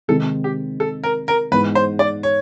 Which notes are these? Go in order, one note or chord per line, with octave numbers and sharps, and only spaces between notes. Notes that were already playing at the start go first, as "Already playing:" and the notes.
C3 D#3 G#3 C4 D#4 A4
G4
A4
A#4
A#4
G#2 E3 G#3 B3 D#4 B4
C5
D5
C#5